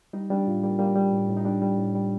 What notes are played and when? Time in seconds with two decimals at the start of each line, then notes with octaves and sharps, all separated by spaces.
0.13 G3 D#4
0.30 G3 D4
0.47 A2 F4
0.64 G3 A#3
0.79 G3 A#3
0.96 G3
1.12 A2
1.29 A2
1.37 D#4
1.45 G3 D4
1.62 G3
1.78 A2
1.95 G3